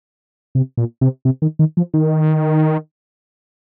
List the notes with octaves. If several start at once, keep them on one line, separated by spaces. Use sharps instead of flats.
C3
A#2
C3
C3
D#3
D#3
F3
D#3